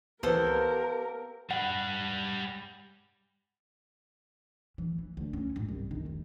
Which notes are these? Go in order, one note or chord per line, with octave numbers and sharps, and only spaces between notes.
C#2 E3 B3 G4 A4 A#4 C5 F5
G3 B4 F#5
E3
E3
D2
C#4
G#1
C2
D#3
F1